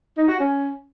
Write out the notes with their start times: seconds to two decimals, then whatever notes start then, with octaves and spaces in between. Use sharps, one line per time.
0.17 D#4
0.28 F#4
0.39 C#4